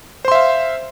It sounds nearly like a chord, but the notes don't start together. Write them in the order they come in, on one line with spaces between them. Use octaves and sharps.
C5 C6 E5 F5